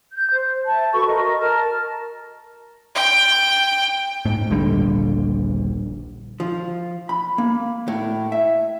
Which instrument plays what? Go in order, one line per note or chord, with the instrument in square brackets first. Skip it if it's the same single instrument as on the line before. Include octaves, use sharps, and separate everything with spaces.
[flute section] G6
C5
E5 A5
F#4 A4 B4 C#6
A#4 D#5
A#4 A5 F6
[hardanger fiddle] G5
[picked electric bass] G#2
D#1 A#1 D3 G3
[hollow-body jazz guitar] F3
B5
A#3
A2
E5